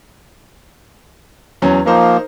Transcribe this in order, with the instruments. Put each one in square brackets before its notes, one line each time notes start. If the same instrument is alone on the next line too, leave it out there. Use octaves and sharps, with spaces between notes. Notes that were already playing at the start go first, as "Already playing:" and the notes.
[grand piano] E2 F#3 C#4
[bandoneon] F3 A#3 [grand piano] D#4 A#4 C5